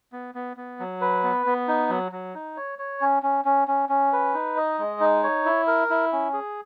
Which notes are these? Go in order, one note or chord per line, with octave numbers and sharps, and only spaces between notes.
B3
B3
B3
F#3
B4
B3
B3
D#4
F#3
F#3
D#4
C#5
C#5
C#4
C#4
C#4
C#4
C#4
B4
D#4
D#5
G#3
D#4
C#5
E4
A#4
E4
C#4
G#4